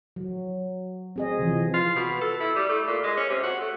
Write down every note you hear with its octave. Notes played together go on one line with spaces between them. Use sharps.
F#3
C4 G#4 D#5
C3 E3 F3
F4
B2
A4
E4
G3
A3
A#2
G#3
C#4
C3
F#4
A3